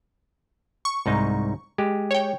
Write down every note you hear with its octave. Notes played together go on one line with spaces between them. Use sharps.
C#6
C2 G#2 D#4
G#3 G4
C#5 G5